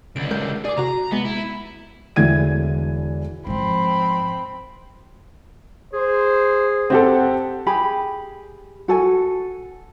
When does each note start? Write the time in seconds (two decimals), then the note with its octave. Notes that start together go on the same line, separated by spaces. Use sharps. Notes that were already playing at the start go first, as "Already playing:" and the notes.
0.16 C#2 D3 D7
0.31 G#3 A#4 G6
0.65 G#4 D5 D6
0.78 C3 F#4 A#5
1.12 G#3 B3
1.25 E4
2.16 E1 D3 E3 G#6 D#7
3.47 G#2 F3 C4 B5
5.93 G#4 C5
6.90 C4 G4 A4 F#5
7.66 G4 G#4 G#5 B5
8.88 F#4 A4 G#5